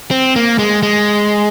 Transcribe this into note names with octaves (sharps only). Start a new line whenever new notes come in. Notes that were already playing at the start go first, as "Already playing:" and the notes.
C4
A#3
G#3
G#3